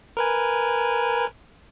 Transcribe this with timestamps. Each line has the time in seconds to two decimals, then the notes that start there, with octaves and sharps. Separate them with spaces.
0.17 A#4 B4 G#5